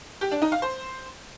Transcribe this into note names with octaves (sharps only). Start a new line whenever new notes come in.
G4
D4
D#4
F5
C5